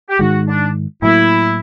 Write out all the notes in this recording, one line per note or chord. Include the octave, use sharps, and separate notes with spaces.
G4
G#2 D#3 G#3 F#4
D4
A2 F#3 A#3 E4